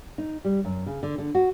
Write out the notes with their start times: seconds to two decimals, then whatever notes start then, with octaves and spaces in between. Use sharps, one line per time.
0.18 D#4
0.45 G3
0.65 F#2
0.86 C#3
1.03 D3
1.18 D3
1.35 F#4